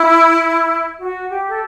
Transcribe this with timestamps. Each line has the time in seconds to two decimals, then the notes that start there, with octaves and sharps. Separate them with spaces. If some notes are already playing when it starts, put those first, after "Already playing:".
Already playing: E4
1.00 F#4
1.30 G4
1.48 A4